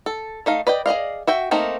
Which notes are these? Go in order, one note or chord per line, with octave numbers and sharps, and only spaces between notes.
A4
A3 D#4 F5
B4 D5 D#5 G5
G#4 D5 D#5 F5
F#4 E5 G5
A3 A#3 C4 D#4 A#4